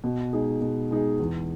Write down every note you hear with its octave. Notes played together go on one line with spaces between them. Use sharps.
B2
G#3 D#4 G#4
B2
G#3 D#4 G#4
E2